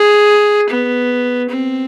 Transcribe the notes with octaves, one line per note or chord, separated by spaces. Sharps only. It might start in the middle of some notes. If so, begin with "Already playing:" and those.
Already playing: G#4
B3
C4